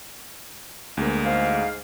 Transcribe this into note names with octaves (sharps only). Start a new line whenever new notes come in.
D2 G#3 A#3
G#2 F5